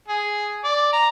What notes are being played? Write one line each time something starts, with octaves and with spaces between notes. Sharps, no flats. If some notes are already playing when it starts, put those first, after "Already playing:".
G#4
D5
A#5